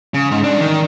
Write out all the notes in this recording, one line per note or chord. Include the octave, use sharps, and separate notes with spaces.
C#3
G#2
C2 D4
D#3